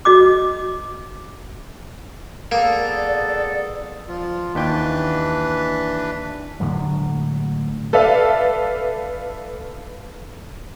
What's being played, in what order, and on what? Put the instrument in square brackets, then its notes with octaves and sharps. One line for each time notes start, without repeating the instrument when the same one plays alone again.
[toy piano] F#4 D#5 D6
[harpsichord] A#3 [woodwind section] B3 G#4 A4 [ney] D5
[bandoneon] F3 F4
[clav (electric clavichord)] D#2 G5 [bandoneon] E3 D4 B4
[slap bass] A2 D3 F#3 G#3
[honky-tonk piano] A4 B4 D5 E5 F5